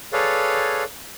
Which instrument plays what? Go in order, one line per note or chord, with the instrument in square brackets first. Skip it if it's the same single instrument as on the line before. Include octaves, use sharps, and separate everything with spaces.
[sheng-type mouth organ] G#4 A4 B4 C#5 D5 F5